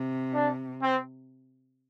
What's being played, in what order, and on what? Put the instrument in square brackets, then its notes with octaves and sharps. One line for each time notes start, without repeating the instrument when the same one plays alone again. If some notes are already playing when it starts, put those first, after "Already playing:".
Already playing: [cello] C3
[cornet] D4
C4